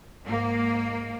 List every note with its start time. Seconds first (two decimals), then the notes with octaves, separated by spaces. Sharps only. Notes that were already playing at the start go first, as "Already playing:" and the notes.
0.24 G#2 A#3